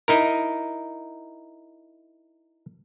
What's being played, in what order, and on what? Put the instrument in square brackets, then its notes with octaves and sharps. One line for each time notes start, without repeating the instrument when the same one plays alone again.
[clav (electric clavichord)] D#4 E4 A#4